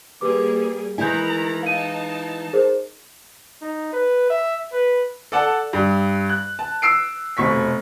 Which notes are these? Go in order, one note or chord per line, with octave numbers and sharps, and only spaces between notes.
G3 A#3 G4 G#4 B4 D6
D#3 E3 G#3 E4 G#5 A#5 B5 G6
D#4 F5 A5 D#7
G#4 A#4 C5
D#4
B4
E5
B4
A4 D5 F#5 A5
G2
F#6
A5
E6 C7 D7
F1 B2 C#6 B6